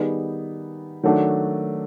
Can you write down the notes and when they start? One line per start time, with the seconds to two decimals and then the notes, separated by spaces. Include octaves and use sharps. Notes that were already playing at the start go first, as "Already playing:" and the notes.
Already playing: D#3 G3 B3 D#4 G#4
1.03 D#3 F#3 A3 D4 F#4